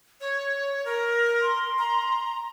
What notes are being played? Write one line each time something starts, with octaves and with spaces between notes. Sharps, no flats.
C#5
A#4
C6
A#5